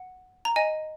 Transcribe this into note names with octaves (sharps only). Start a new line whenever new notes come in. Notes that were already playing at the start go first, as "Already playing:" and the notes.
Already playing: F#5
A#5
D#5 G#5